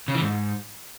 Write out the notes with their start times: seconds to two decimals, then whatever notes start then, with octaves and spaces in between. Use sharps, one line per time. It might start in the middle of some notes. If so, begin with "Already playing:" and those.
0.08 C#3
0.15 E3
0.22 G#2